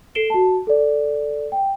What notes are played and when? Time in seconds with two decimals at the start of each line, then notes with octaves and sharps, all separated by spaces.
0.15 A4 C7 D7 E7 G7
0.30 F#4 A5
0.67 A4 D5
1.52 G5